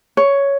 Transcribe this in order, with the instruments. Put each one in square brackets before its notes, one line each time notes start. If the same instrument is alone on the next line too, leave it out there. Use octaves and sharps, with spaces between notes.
[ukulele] C#5